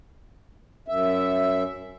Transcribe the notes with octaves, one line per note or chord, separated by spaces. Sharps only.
F#2 E5